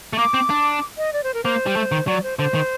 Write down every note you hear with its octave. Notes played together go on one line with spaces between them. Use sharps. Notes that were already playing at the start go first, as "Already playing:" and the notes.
A3
A#3 D6
C4
D4
D#5
D5
C5
A#4
A#3 C5
G3
A3
D#3
F#3 D5
C5
D3 C5
D#3